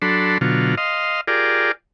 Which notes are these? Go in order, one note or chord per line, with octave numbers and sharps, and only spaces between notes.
F#3 D4 A4 B5 C6
B2 D3 F#3 F4
D#5 F5 C6
F4 G4 G#4 A#4 D5